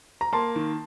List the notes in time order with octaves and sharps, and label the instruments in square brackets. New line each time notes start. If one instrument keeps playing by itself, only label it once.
[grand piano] A#5
[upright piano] A#3 [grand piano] A5 C6
[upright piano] D#3